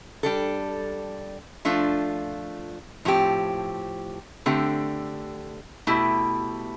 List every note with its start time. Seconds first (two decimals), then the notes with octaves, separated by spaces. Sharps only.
0.23 G3 D4 A4
1.65 F3 A3 D4 F4
3.05 A2 F3 C4 G4
4.46 D3 A3 C4 G4
5.87 B2 A3 E4 G4